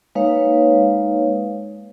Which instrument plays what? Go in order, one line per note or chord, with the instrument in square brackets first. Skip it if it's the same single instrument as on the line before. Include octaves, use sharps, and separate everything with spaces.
[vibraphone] G#3 A#3 D#4 B4 C#5 F5